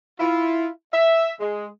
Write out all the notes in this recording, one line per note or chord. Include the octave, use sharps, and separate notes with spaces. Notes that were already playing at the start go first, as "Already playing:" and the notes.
E4 F4
E5
G#3